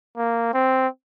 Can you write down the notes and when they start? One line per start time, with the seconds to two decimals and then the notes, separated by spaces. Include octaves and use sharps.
0.17 A#3
0.54 C4